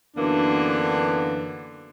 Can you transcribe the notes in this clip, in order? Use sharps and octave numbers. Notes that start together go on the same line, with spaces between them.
F#2 D3 E3 A#3 B3 D4